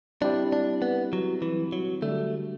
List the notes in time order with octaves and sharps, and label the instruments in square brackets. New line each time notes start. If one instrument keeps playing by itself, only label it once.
[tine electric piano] G3 C4 E4 G4 [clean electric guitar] D4
[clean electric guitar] D4
B3
F#3
E3
F#3
[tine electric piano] D3 G3 D4 F#4 [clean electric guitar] A3